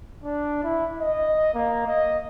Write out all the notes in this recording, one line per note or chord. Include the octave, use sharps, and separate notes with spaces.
D4
E4
D#5
A#3
D#5